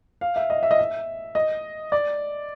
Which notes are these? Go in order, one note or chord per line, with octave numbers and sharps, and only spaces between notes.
F5
E5
D#5
E5
D#5
E5
D#5
D5